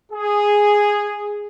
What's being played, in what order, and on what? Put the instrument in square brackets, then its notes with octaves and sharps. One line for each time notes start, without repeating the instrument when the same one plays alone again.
[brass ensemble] G#4